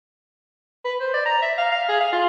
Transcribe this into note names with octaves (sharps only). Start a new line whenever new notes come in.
B4
C5
D5
A#5
E5
F5
F5
G#4
F5
F4